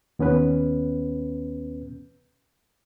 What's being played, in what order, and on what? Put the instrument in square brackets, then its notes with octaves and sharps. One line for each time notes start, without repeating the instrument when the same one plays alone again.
[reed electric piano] D#2 B3 C#4 B4